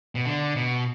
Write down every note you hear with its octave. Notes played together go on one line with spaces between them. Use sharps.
B2
D3
B2